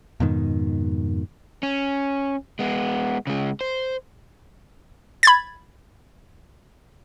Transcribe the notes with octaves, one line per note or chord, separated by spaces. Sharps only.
F2 G#2 B2 D#3
C#4
G#3 B3
C#3 G#3
C5
B5 G#6 A6